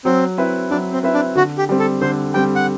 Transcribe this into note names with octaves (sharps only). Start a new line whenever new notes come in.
F#3 C4
C4 E4 B4 E5
F#3 D4
C4
C4 E4 B4 E5
D4
D3 F#4
G4
G3 C4
A4
D3 C5
G3 C4 G5
F#5